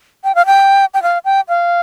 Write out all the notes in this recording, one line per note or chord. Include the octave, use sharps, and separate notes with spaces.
G5
F5
G5
G5
F5
G5
F5